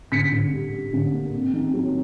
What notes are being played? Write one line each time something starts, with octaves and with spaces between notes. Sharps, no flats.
D3 B6 C#7
D3
G3
G3
D3
A#3
C3
D#3
F#3